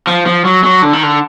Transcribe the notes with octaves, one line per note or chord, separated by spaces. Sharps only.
F3
F3
F#3
F#3
D3
D#3
D3